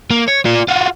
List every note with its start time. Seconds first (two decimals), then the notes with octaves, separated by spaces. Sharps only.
0.11 A#3
0.28 C#5
0.45 F4 D5
0.68 F4 F#4